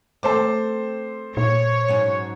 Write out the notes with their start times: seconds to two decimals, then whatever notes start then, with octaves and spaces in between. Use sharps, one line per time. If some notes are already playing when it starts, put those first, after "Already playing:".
0.23 A3 C4 A4 C5 D6
1.37 A#2 C#5
1.88 G#2 F#3 C#4